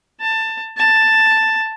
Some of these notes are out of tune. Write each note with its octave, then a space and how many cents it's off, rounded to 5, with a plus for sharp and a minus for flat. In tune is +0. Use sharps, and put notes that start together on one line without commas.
A5 +20
A5 +5